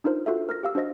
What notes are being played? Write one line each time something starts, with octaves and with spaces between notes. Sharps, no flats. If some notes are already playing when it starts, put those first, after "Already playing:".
D4 D#4 F4 A#4 C5
F4 F#4 A4 E5
A#4 F6 A#6
G4 F5 E6
D4 F#4 C5 D#5 A#6